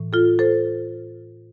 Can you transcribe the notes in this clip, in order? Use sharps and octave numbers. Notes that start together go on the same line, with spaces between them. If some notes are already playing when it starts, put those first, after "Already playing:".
Already playing: A2 E3
F4 A4
A4 C5